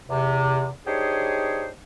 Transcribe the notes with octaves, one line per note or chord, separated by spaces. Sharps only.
E2 C3
D4 D#4 G4 G#4 C5 C#5